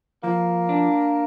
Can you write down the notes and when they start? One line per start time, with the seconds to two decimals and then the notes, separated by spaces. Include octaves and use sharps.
0.24 F3 A#3
0.69 D4